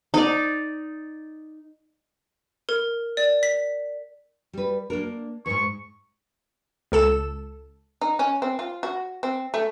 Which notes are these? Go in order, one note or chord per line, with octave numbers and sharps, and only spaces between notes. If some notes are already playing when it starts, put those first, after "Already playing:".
D#4 D5
A#4
D5
B6
G3 B4
A#3 D4 A#4
E2 G#2 C#6
C#2 A4 E7
D#4
C#4
C4
F4
F#4
C4
A3